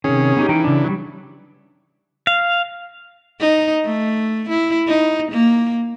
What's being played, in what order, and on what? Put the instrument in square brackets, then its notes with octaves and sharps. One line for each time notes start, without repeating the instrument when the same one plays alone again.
[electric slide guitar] C3 D#3 [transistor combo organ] C#4 G#4
[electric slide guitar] B3 D#4 G4
[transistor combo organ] E3 [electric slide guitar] D#4 G5
[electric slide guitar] C#3 D4
F#3 G3
[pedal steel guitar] F5
[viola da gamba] D#4
A3
E4
D#4
A#3